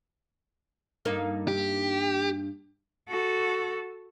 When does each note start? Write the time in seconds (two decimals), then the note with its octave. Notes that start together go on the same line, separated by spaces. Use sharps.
1.05 G2 A#3 D#4
1.48 G4
3.09 F#4 A4